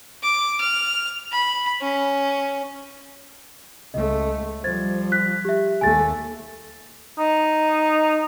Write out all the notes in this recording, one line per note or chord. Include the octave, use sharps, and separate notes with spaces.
D6
F6
B5
C#4
C#2 A3 D#5
F3 G3 C5 G#6 A6
F#6 B6
G4 E5
D#2 A3 G#5 A6
D#4